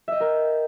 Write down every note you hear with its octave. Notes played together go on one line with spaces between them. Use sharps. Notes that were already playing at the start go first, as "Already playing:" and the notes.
A#4 D#5 E5 G5